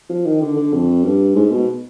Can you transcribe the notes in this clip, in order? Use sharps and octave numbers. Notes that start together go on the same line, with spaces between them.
F3
D#3
D3
D3
F2
G2
G#2
B2